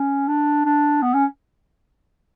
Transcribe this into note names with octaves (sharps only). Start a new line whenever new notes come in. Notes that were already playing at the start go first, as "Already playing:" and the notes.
Already playing: C#4
D4
D4
B3
C#4